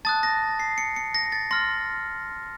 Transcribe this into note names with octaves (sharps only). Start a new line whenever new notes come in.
A5 D#6 F#6 A6
A#6
C7
C#7
C#7
A#6
A6
C6 F6 A#6